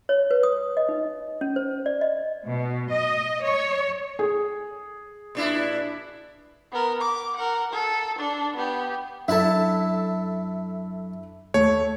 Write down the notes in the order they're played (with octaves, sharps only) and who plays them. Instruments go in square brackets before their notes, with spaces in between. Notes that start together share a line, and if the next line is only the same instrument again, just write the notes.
[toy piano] C#5
B4
D#6
D#5
D#4
C#4
C5
D5
D#5
[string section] B2
D#5
C#5
[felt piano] G#4
[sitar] A#2 D4 E4
[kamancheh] B3 A#4
D6
A#4 F#5
A4
D4
B3 G4
[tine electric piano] F#2 F#3 [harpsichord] D4 E4 A5 [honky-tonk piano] A4 E5
[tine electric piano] D#2 [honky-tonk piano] A3 [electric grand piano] C#5